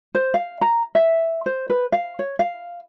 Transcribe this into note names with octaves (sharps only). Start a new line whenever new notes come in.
C5
F5
A#5
E5
C5
B4
F5
C#5
F5